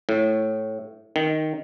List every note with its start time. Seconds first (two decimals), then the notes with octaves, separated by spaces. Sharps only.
0.09 A2
1.16 D#3